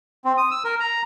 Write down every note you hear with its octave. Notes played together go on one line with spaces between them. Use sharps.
C4
D#6
E6
A#4
A#5